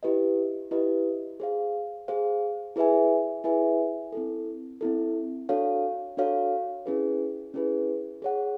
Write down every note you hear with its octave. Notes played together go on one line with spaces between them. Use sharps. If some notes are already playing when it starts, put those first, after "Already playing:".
E4 G4 B4 D#5
E4 G4 B4 D#5
G#4 C5 F5
G#4 C5 F5
E4 G#4 B4 E5 G#5
E4 G#4 B4 E5 G#5
C4 E4 A4
C4 E4 A4
D4 F#4 A4 C#5 F5
D4 F#4 A4 C#5 F5
C#4 E4 G#4 B4
C#4 E4 G#4 B4
G#4 C#5 F#5